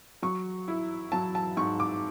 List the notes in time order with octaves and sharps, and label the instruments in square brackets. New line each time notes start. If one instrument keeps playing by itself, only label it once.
[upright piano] F#3 C#6
E4
F#3 A5
A5
G#2 C#6
D6